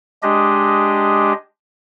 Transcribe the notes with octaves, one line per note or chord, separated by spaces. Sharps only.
G#3 D4 G4 D#5